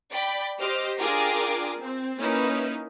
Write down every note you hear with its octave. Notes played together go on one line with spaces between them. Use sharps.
D5 G5 B5
G4 C5 D#5 D6 F6
D4 F4 G#4 A#4 G5 D6
C4
A#3 C#4 D#4 E4 B4